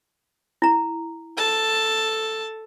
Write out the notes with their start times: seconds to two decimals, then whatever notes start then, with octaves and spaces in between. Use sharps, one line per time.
0.62 E4 A#5
1.37 A4 A5